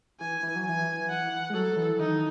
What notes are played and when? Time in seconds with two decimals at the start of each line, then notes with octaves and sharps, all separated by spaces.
0.20 E3 G#5
0.43 E3
0.56 F#3
0.65 E3 G#5
1.10 F#5
1.50 G#3
1.54 F#3 A4
1.76 E3
1.98 D#3 D#4